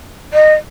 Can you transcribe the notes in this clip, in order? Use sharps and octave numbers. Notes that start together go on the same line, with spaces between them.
D#5